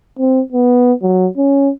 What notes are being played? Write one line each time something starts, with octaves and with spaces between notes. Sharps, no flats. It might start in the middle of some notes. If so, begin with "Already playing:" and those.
C4
B3
F#3
C#4